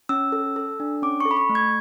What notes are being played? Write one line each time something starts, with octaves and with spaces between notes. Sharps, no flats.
C#4 E6
A4
A4
D4
C#4 D6
C#6
A4
B5
C#6
A3
G#6